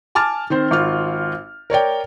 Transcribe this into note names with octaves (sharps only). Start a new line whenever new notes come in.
G#5 A5 D6 F6 A6
D#3 C4 C5
G#1 F4 F6
A#4 C#5 D5 G5